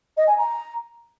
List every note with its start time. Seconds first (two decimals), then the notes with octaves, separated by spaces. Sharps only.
0.17 D#5
0.27 G#5
0.37 A#5